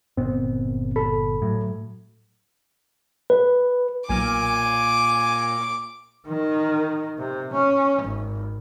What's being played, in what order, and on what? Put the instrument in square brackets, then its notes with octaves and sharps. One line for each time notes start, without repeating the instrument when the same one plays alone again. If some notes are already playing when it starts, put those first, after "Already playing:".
[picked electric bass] G1 A#2 B3 [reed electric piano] C4
[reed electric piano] A4 B5
[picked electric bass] A2 F#3
[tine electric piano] B4
[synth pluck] B1 F6 [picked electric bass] A#2 [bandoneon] G#5 [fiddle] D6
[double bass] D#3
C3
C#4
G#1